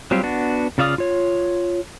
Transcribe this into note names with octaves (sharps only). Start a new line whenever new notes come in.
F#3 G3 C4 F4 G4
B3 D4 F#4
C#3 F4 D5 F5 D#6
F4 C#5